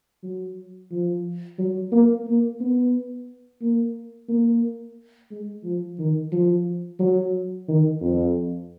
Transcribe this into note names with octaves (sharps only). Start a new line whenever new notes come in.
F#3
F3
F#3
A#3
A#3
B3
A#3
A#3
G#3
F3
D#3
F3
F#3
D#3
F2